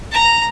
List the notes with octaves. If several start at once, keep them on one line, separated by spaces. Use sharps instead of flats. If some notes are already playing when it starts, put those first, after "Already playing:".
A#5